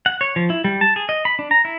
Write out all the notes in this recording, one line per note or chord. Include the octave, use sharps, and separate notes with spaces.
F#5
C#5
F3
E4
G3
A5
G#4
D#5
B5
D4
A#5
E4